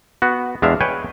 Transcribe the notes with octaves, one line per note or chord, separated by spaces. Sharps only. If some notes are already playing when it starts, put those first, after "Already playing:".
B3 F#4
E2 G#3 D4 E5 F5
B4 C#5 G5 G#5